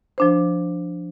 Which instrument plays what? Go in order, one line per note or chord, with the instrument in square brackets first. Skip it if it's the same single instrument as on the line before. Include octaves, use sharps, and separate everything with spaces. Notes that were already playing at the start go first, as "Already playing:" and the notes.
[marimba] F3 D4 C5